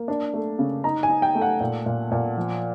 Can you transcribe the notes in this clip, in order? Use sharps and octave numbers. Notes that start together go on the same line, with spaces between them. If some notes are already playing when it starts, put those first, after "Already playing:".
Already playing: A#3
D4
A3
C#3
D#4 A#5
G#5
D#4
G5
A3
F#5
A#2
A#2
A#2
F3